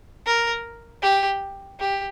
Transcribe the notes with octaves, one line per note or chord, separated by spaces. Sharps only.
A#4
G4
G4